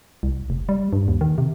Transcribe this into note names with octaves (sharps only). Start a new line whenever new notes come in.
C2
F1
G3
G2
D#2
D#3
C3